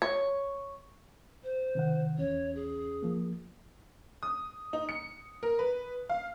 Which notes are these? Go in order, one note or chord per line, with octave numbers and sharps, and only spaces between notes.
C#5
C5
C3 D#3 F#5
E2 C#4 C#5
G#4
F3 A#3
D#6
D#4
C#7
A#4
B4
F5